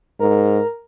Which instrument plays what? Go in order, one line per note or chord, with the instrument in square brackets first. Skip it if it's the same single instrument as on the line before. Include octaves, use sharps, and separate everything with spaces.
[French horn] G#2 [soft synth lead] A#4